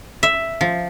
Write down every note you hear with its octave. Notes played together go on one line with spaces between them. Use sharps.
E5
F3